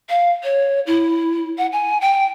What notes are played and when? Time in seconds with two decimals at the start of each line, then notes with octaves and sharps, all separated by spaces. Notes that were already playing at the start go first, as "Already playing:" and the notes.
0.09 F5
0.44 C#5
0.86 E4
1.58 F#5
1.72 G#5
2.01 G5